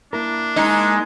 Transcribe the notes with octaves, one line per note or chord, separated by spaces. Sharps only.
A#3 D4 E4 A#4
G#3 D#4